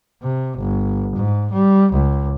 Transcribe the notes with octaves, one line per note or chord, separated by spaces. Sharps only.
C3
G1
G#2
G3
C#2